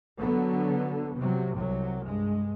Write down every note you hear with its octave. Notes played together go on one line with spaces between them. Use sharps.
D3 F#3 B3
C3 F#3
C2 C3 F#3
G2 G#3